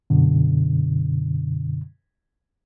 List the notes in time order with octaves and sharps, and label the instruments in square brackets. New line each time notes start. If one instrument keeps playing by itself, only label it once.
[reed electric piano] F#2 B2 D3